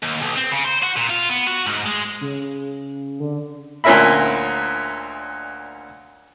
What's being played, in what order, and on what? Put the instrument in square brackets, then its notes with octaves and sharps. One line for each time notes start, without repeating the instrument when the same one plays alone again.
[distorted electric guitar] D#2
B1
C4
C#3
C5
F#4
A#2
F4
B3
F#4
G#2
G#3
[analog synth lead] C#3
D3
[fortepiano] D2 A#2 C#4 A#4 E5 B5